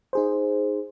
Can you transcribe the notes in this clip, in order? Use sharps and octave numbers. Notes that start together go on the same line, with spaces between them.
D#4 G#4 C5